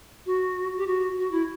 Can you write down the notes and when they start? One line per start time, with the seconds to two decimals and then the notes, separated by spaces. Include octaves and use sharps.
0.26 F#4
0.77 G4
0.87 F#4
1.17 F#4
1.32 E4